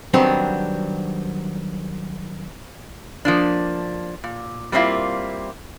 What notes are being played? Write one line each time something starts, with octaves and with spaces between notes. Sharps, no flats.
D#3 F#3 G3 B3 C4 D4
F3 A#3 D4
A#2
G3 A#3 C4 D4 E4 F4